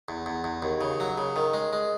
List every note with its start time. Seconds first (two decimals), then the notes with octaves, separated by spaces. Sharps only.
0.08 E2
0.26 E2
0.44 E2
0.62 D#2
0.81 C#3
1.00 F#3
1.18 C#3
1.36 D#3
1.54 G#3
1.73 G#3